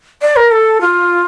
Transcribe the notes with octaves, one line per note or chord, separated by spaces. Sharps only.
D5
A#4
A4
F4